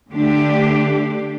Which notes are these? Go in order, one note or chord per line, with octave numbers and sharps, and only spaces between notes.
D3 A3 D4 G4